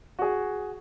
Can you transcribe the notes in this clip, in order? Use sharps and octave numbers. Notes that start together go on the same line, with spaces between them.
F#4 G#4